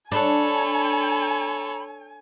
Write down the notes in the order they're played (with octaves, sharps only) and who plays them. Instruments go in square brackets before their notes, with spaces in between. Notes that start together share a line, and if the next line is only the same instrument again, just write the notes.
[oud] D4 [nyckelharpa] A4 C#5 [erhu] G#5 [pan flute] B5